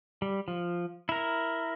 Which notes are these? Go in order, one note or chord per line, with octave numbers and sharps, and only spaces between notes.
G3
F3
E4 A#4